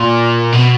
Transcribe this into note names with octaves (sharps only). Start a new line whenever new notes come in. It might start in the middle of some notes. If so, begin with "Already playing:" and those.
Already playing: A#2
B2